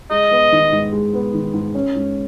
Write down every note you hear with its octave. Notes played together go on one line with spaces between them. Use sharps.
G#3 D#5
B3
D#3
G#2
G#3
B3
D#3
G#2
C#4
G#2